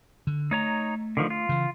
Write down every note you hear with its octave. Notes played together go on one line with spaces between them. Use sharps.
D3
A3 D#4 C#5 A#5
D3 D#3 F3
F4
C#3 E3